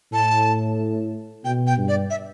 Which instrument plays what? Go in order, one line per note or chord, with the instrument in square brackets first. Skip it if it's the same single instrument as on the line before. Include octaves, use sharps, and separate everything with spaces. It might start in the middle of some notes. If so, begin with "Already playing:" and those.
[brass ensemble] A2 [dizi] A5
[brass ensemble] B2 [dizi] G5
[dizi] G5
[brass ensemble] G2
[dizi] D5
E5